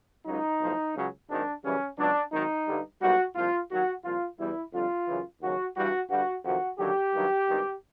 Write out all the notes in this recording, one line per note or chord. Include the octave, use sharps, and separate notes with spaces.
C#2 C#3 F#3 D#4
B1 A2 F3
C#2 C#3 F#3
G#1 G#2 D#3 F#3 D4
F#2 C#3 E3 G3 C#4
C#2 B2 F#3 D4
G#1 F#2 D#3 F#3 D#4
G2 D3 G3
B1 A#2 G3 F#4
C2 A#2 F3 F4
D#2 D#3 F#3 F#4
C2 A#2 F3 F4
E2 B2 G3 E4
F2 D3 G3 F4
F#2 C#3 E3
D#2 C#3 F#3 F#4
G2 E3 G3 F#4
G2 D3 G3 F#4
F2 C3 D#3 F#3 F#4
D#2 D3 F#3 G4
G2 D#3 F#3
G#1 G2 D#3